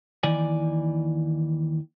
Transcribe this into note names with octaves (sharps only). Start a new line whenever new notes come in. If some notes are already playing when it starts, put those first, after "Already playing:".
D#2 D#3 E3 D5 G#5